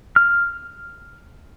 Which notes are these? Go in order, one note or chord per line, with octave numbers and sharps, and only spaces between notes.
F6